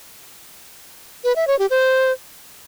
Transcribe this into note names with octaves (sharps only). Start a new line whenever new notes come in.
B4
E5
C#5
G4
C5